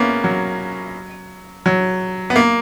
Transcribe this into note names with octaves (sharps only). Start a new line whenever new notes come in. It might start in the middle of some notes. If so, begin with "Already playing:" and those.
Already playing: A#3 B3 C#4
F#3
F#3
B3
A#3